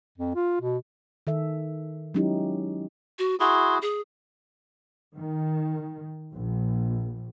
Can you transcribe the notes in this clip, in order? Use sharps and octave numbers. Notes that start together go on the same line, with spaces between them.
F2
F4
B2
D#3 A4 E5
F#3 G#3 C#4 D#4 E4 G4
F#4
E4 F#4 G#4 C6
G#4
D#3
A#1